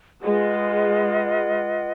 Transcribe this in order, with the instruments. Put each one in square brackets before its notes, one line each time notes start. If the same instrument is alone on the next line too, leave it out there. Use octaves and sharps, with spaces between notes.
[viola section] G#3 [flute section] F4 B4 D#5 F#5